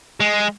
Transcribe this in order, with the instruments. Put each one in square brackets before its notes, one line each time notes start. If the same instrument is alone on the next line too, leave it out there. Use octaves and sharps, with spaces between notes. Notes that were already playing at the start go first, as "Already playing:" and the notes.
[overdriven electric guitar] G#3